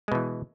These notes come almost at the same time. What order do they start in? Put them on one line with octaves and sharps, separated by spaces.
G#3 B2 E3